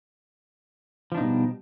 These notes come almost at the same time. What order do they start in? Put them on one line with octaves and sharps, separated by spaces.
F3 D4 D#4 B2 G3